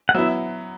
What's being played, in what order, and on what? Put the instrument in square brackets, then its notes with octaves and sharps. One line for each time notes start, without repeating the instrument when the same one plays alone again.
[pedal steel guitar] F#5
[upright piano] F#3 B3 E4 [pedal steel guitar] E5